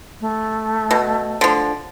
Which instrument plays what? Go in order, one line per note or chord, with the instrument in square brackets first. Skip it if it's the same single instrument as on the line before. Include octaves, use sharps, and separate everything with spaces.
[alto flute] A3
[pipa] B2
D3 F3